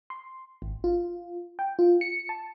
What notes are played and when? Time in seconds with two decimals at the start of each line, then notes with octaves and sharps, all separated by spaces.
0.10 C6
0.62 G#1
0.84 F4
1.59 G5
1.79 F4
2.01 C#7
2.29 A5